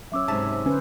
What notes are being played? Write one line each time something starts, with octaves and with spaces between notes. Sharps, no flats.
F#3 C#4 C#5 E5 D6 E6
G#2 C3 A5
D3 C#4 B4 C5